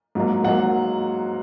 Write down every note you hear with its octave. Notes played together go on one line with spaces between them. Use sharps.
G#2 F#3 A#3
G#2 F#3 A#3 F#5